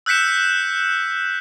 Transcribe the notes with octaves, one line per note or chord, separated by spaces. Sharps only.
E6 F#6 G6 B6 C#7 E7